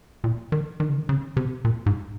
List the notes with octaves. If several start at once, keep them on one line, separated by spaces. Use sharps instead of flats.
A#2
D#3
D#3
C#3
D#3
C#3
C3
A#2
G#2